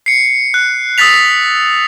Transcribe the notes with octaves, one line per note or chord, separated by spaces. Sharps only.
C7 C#7
F#6
D#6 E6 F#6 A6 B6 F7